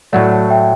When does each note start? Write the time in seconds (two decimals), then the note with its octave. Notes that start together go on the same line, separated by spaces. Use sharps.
0.13 A2 F#3 A3 D5 F#5
0.31 F#5 A5
0.50 E5 G5